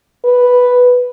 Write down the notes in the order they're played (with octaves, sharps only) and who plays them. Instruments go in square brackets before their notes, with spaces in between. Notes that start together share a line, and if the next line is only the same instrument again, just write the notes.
[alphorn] B4